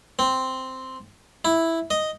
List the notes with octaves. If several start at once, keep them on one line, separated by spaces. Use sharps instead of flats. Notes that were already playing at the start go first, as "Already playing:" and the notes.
C4
E4
D#5